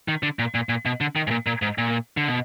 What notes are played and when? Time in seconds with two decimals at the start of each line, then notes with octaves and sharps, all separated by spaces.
0.08 D#3
0.23 D3
0.39 A#2
0.55 A#2
0.69 A#2
0.86 B2
1.01 D3
1.16 D#3
1.27 G#2
1.31 A#2
1.46 A#2
1.62 G#2
1.78 A#2
2.17 D3
2.27 B2